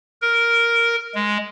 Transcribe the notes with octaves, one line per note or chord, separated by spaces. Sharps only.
A#4
G#3